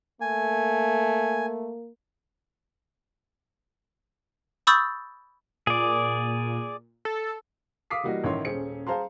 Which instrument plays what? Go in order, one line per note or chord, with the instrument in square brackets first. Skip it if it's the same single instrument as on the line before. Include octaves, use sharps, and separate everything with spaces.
[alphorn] A3 [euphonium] A#3 [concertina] G#5
[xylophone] B5 C#6 D#6 E6 G6 A6
[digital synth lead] A#2 [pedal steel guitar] G#4 D5
[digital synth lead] A4
[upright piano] F5 D6 D#6 B6 C7
E3 G3 A#3 F#4 D#5
A1 D#3 E4 C#5 D#5 C6
D#1 C#4 G#4 C5 C#7
G#4 C5 F5 A5 A#5 C6